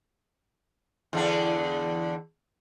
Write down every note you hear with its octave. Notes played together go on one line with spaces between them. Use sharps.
E2 D3 D4